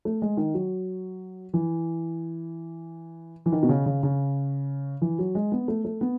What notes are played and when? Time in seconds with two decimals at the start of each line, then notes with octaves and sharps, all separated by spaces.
0.05 A3
0.22 G#3
0.37 D#3
0.54 F#3
1.54 E3
3.46 E3
3.52 D#3
3.63 B2
3.69 C#3
3.86 C#3
4.03 C#3
5.02 E3
5.19 F#3
5.35 G#3
5.52 B3
5.68 A3
5.85 A3
6.01 B3